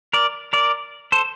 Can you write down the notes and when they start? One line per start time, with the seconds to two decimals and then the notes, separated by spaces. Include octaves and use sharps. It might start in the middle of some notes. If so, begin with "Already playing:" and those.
0.13 A#4 D5
0.53 A#4 D5
1.12 A4 C5